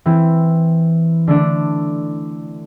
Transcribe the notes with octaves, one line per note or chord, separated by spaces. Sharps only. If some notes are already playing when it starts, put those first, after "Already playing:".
E3 C4 E4
D3 A3 D4